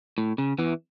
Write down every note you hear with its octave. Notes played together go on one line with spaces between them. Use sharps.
A2
C#3
E2 E3